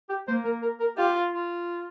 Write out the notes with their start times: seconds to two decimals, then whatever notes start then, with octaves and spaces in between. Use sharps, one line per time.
0.09 G4
0.27 A#3 C5
0.44 A#4
0.62 A#4
0.80 A#4
0.97 F4 G4
1.32 F4